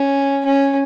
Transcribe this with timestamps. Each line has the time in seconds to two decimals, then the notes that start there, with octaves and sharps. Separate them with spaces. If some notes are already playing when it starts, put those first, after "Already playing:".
Already playing: C#4
0.45 C#4